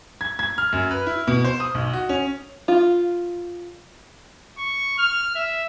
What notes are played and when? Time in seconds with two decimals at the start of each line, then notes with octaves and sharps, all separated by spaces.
0.21 G#6
0.39 G#6
0.58 F6
0.73 F#2
0.91 B4
1.07 E4
1.27 B2
1.44 C5
1.60 D#6
1.74 B1
1.93 F#4
2.09 C#4
2.68 F4
4.58 C#6
4.98 F6
5.35 E5